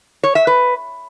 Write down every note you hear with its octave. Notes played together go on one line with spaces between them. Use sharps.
C#5
E5
B4